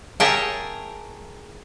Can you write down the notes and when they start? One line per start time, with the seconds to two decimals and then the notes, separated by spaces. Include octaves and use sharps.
0.20 G#4 A#4 C#5 E5 G5 A5